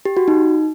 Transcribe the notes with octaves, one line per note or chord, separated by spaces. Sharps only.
G4
F#4
D#4